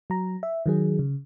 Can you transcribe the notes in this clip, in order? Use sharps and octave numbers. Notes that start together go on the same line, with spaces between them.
F#3 A#5
E5
D#3 F#3 G#4
C#3